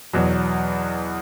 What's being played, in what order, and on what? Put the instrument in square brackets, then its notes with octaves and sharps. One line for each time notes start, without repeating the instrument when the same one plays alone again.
[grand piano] E2 B2 F#3